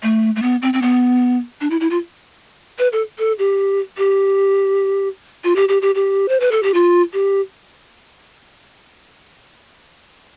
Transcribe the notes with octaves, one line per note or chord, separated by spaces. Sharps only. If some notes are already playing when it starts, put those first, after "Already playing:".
A3
A3
B3
C4
C4
B3
D4
E4
E4
F4
B4
A4
A4
G4
G4
F4
G4
G4
G4
G4
C5
B4
A4
G4
F4
G4